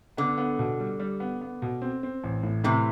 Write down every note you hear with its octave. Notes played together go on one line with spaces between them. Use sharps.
D3 B3
B3
B2
G3
G3
B3
B3
B2
C4
C4
A1
A2
A2 C3 E3